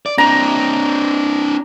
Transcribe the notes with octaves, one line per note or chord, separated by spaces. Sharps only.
D5
C4 D4 A#5